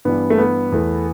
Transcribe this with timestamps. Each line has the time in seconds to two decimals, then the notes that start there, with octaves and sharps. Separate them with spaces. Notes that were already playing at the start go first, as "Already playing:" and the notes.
0.05 G2 E3 G3 B3
0.30 A3
0.38 B3
0.72 E2 E3 A3